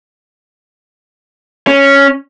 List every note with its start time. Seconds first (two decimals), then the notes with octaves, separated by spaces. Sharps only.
1.67 C#4